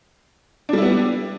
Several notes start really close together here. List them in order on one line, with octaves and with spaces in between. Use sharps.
D4 G3 E4 B3